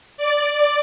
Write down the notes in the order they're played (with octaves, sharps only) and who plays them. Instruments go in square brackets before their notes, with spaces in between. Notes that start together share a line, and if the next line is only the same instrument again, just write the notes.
[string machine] D5